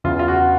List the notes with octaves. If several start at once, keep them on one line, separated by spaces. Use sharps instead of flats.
E2 C#3 E3 F4
F4
F#4